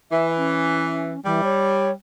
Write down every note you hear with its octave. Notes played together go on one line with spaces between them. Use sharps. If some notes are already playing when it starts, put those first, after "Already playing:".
E3 E5
C#4
E3 G3
C#5